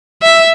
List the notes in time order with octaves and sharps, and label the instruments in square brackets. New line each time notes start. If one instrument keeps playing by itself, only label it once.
[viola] E5